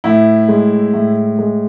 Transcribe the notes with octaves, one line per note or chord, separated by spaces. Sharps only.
A2 E4
G#3
A2
G#3